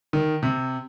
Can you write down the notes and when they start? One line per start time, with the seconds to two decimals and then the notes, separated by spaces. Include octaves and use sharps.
0.13 D#3
0.43 C3